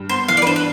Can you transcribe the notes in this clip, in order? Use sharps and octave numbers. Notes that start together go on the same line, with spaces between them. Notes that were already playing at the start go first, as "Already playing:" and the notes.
Already playing: G2
B3 C5
E3 F5
D5
B4
D4 C5
B4